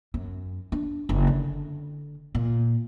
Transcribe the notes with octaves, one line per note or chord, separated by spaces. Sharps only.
F#2
D4
F#1
D3
A#2